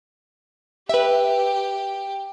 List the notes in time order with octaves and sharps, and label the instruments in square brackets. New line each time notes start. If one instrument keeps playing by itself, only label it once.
[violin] G4 [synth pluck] B4 E5